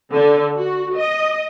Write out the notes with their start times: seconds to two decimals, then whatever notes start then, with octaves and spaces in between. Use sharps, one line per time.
0.12 D3
0.55 F#4
0.97 D#5